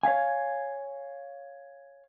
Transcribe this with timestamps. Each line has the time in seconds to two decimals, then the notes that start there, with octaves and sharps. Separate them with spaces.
0.03 C#5 E5 F5 G#5